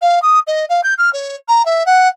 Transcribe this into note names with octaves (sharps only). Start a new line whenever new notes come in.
F5
D#6
D#5
F5
G6
F6
C#5
A#5
E5
F#5